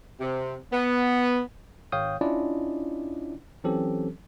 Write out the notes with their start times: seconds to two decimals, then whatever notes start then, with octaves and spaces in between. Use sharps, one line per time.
0.21 C3
0.72 B3
1.92 G#1 C#5 F5 G5 D#6 G6
2.21 C#4 D4 E4 F4 D5 D#5
3.64 E3 F#3 C4 C#4 G4 A4